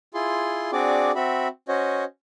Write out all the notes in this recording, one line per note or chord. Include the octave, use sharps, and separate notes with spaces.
E4 F4 G#4 C6
C4 D4 F#4 G#4 D5 D6
C4 F#4 E5 B5
C#4 F#4 C5 C#5 D#5